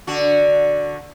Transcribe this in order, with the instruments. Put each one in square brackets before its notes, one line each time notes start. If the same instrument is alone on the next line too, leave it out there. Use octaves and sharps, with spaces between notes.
[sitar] D3 F#4